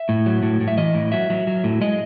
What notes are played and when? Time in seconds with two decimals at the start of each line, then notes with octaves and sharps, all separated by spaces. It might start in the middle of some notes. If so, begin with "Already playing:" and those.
Already playing: E5
0.09 A2
0.26 F#3
0.43 A2
0.61 A2
0.68 E5
0.78 E3 D#5
0.95 A2
1.12 F#3 E5
1.30 F#3
1.47 F#3
1.64 A2
1.81 G#3 D#5